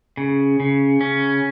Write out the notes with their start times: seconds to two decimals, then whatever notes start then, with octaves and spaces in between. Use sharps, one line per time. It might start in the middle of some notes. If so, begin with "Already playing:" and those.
0.17 C#3
0.60 C#3
1.01 C#4